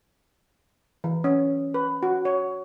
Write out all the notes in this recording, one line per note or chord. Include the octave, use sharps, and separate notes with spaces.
E3
C#4
B4
F#4
C#5